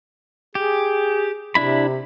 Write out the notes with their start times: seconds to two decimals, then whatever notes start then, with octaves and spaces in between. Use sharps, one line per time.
0.55 G4 G#4
1.55 C3 D4 E4 B5